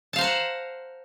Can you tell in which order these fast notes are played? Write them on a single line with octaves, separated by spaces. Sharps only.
A5 F5 C5 A#5 F#5